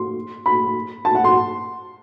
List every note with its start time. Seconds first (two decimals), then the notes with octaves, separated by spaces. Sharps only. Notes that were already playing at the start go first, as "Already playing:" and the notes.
Already playing: C6
0.46 B5
1.05 A5
1.15 F#5
1.24 C6